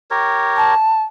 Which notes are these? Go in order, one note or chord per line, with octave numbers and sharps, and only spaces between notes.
G4 A#4 C#5
A5